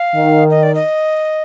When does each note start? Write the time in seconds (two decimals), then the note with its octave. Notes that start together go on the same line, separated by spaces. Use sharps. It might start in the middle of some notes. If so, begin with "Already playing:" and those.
Already playing: F5
0.14 D#3
0.50 D#5
0.63 D5
0.75 D#5